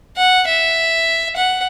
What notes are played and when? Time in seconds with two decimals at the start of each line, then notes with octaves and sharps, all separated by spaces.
0.17 F#5
0.48 E5
1.36 F#5